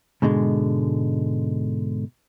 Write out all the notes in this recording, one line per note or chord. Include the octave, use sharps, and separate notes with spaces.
G#2 B2 D3 G#3